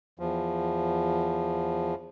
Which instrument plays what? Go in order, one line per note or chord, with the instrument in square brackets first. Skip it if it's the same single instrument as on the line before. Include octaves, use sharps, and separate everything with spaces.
[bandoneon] E2 F3